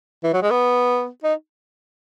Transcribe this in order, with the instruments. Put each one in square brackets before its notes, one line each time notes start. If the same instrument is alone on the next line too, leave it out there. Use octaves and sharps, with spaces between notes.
[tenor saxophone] E3
F#3
G#3
B3
D#4